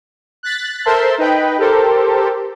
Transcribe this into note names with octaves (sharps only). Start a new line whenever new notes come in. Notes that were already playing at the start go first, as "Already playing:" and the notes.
F#6 A6 B6
A4 A#4 C5 E5 A5 C6
D#4 B4 D#5 G5 B5
G4 A4 A#4 C5